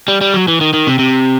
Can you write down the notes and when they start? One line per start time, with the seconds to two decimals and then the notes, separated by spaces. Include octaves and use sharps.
0.08 G3
0.21 G3
0.34 F#3
0.48 E3
0.61 D#3
0.74 D#3
0.87 C3
0.99 C3